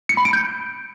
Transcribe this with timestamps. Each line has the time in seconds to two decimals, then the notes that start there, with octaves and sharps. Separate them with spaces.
0.09 C#7
0.17 B5
0.25 D7
0.33 G6